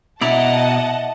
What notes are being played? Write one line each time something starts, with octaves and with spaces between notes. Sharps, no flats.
B2 E4 D5 D#5 F#5 A5 A#5